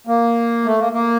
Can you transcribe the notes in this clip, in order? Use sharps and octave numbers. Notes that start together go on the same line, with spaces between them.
A#3
A3
A#3
A#3